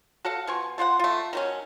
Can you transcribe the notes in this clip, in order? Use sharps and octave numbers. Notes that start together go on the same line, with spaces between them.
F#4 A4 F5 F#5
B2 F3 G#5 C#6
A3 F4 C5 F#5
A3 F4
D#3 F#3 C#4